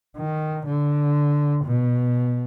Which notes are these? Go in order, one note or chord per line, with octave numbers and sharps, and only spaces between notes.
D#3
D3
B2